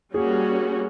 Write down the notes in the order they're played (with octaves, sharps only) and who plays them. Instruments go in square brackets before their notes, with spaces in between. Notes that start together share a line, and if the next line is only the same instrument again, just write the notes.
[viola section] G3 A#3 C#4 F#4 [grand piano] G#4